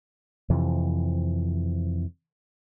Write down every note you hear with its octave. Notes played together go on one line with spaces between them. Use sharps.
F2 C3 E3